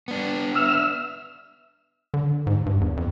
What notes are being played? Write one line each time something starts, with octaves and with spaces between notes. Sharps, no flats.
B3 D4
E5 E6 F6
D3
G#2
G2
E2
F2